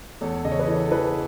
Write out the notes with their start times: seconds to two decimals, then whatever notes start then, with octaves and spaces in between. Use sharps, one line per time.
0.21 E2 A4 C#5
0.45 C#3 D#5
0.52 C#5
0.59 B4 D#5
0.68 E3 A4 C#5
0.86 A4
0.91 E3 G#4 B4